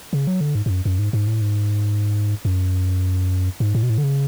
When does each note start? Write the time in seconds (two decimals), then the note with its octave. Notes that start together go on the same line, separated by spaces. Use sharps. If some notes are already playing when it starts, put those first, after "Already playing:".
0.13 C#3
0.27 F#3
0.41 D3
0.55 G#2
0.66 G#2
0.70 F#2
0.85 F#2
0.99 G#2
1.13 G#2
1.27 A2
1.41 G#2
2.45 F#2
3.60 G#2
3.75 A2
3.83 B2
3.90 A2
3.98 D3
4.04 C#3